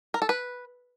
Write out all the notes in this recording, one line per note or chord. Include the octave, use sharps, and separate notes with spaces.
A#4
A4
B4